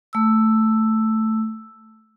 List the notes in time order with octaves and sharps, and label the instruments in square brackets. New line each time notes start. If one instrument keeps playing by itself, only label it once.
[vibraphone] A3 E6